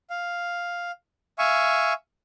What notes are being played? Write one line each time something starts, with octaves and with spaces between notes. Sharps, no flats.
F5
E5 F5 G#5 C#6